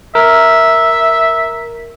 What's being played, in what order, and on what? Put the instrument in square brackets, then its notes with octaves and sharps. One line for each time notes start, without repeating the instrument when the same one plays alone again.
[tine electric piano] A#4 [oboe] E5